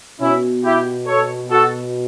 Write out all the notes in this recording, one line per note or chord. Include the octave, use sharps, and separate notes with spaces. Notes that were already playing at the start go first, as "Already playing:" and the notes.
B2 C#4 E4
E4 G4
A4 C#5
F#4 A4